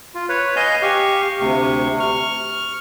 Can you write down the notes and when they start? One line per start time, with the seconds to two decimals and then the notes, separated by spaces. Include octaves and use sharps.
0.15 F4
0.29 B4 C#5
0.56 D#5 F5 G#5 G6
0.82 G4 F5 C#6
1.40 D2 C3 C#6
2.00 C#6 F6